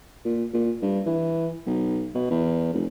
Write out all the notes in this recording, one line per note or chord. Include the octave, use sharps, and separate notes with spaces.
A#2
A#2
G2
E3
B1
B2
E2
F1